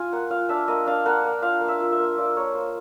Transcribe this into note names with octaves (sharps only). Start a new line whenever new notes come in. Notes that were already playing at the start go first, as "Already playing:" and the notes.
Already playing: F4 G#5
A#3 F#5
F4 F5
D4 E5
A#3 D#5
D4 F5
A#3 F#5
A#3
F4 F5
A#3
E5
F4
E5
A#3
F4 D5
A#3 C#5
A#3 C5